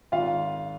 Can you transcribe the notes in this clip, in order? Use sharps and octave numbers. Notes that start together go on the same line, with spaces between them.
G#1 F4 F5